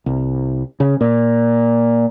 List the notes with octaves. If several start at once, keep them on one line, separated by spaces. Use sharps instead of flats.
C2
C#3
A#2